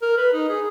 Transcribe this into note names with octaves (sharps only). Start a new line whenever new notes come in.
A#4
B4
D#4
G#4